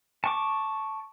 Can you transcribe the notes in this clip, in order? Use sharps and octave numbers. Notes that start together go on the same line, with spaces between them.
A5 C#6 D6